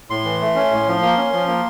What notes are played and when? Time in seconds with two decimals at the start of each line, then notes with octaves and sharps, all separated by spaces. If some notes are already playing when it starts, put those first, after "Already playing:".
0.10 A2 C6
0.25 E3
0.41 A3
0.55 C#4
0.72 A2
0.87 F3
1.02 A#3
1.17 C#4
1.33 F3
1.48 A#3